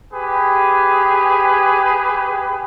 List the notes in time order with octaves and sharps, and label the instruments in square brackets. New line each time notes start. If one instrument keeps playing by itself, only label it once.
[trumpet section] G4 G#4 B4